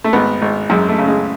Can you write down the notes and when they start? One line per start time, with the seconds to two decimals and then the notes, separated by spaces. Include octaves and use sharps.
0.04 A3
0.13 G#1 B3
0.42 G#1
0.70 F#2 G#3
0.88 A3
0.98 C#3
1.07 G#3